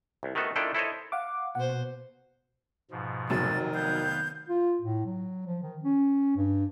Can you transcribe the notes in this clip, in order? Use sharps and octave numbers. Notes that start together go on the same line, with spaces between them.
C2
D#3 A3 B3 F#4 A4
D#3 D4 E4 F4 A4 G5
E4 A4 C5 C#5 D#5
F5 F#5 D6
B2 C5 F#5
G#2 B2 F3
F1 D#3 F#3 A6
B3 F5 G6
F4
A2
F#3
F3
D#3
C#4
G2